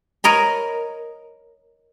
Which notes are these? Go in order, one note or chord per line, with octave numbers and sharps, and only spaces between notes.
A#4 C#5 D#5 A#5 B5